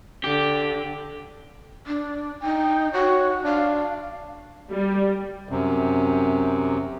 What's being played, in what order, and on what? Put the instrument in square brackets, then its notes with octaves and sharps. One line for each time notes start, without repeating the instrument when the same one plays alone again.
[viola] D3 [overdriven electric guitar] G4
[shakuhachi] D4
[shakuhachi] D#4 [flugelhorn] G5
[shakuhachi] F#4 [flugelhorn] C#5
[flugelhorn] D4 [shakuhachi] F5
[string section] G3
[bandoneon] F#2 C3